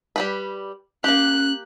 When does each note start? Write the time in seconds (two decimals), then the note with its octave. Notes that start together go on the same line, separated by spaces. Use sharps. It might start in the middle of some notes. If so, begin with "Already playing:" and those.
0.16 G3 G4 B4
1.04 A#3 C#4 G4 F#6